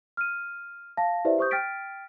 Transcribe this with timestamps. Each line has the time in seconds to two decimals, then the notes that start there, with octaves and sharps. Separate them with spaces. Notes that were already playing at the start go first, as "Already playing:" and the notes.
0.17 F6 D#7
0.97 F5 A5 A#6
1.25 E4 G4 B4 C5 D5 E5
1.38 G4 C5 C#6 D#6 G6
1.51 G5 F6 A6 B6 D7